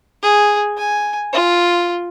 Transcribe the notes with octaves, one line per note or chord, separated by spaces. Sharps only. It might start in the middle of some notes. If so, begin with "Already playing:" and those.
G#4
G#5
F4